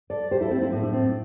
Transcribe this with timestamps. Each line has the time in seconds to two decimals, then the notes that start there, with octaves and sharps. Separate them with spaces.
0.10 A4 D5
0.31 G4 C5
0.41 E4 A4
0.51 C4 E4
0.61 C4 E4
0.71 A2 A3 C4 D4
0.83 D4
0.93 C4